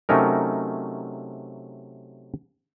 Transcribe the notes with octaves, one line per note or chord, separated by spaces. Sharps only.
C3 F#3 A3 C#4 D#4 A#4